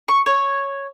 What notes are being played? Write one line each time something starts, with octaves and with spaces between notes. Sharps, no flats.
C#6
C#5